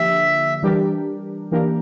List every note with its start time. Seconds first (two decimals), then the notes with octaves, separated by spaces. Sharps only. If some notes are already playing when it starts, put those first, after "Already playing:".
Already playing: D3 F3 A#3 D4 G4 E5
0.62 E3 G3 D4 G4 A#4
1.52 E3 A#3 D4 G4 A#4